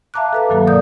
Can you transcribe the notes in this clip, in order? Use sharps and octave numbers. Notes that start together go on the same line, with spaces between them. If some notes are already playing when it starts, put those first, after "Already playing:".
E5 F5 A5 A#5 D6 F#6
A4 B4 F5
G2 D#3 F#3 A#3
B2 A#4 D5 D#6 G6